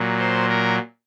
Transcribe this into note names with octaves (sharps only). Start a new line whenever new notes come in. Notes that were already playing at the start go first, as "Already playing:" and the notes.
Already playing: A#2 F#3
C5
A#4